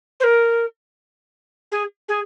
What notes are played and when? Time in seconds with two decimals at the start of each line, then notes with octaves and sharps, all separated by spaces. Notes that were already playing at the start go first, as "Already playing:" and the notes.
0.20 C5
0.24 A#4
1.72 G#4
2.08 G#4